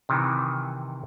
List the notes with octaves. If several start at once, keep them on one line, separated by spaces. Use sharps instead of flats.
C3 D#3 E3